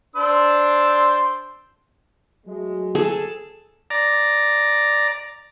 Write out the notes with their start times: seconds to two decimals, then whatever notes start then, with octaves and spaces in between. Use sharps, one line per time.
0.16 D4 C5 E6
2.46 F#3 G#3 A3
2.95 G#4 A4
3.90 D5 A#5